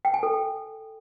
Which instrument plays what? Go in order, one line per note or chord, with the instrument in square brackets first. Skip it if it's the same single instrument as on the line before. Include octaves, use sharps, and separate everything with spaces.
[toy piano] G5
G#5
A4